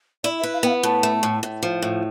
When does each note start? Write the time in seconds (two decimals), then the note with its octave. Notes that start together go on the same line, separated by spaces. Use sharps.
0.24 E4 D5
0.39 E5
0.43 B4
0.53 F5
0.63 B3 G5
0.69 F5
0.83 A2 A5
1.03 A3
1.23 A2
1.43 A2
1.63 F3
1.82 A2